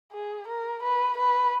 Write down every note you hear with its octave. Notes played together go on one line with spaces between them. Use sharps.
G#4
A#4
B4
B4